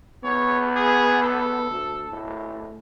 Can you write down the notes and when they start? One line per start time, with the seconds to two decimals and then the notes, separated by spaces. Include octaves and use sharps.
0.24 B3 C#5
0.76 G#4
1.23 A4
1.71 D2
2.10 A2